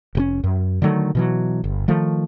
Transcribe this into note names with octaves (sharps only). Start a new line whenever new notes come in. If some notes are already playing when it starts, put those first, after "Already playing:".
F1 C3 C#4
F#2
D3 D#3 F#3 A3
B2 E3 F#3
G1
D#3 F3 A3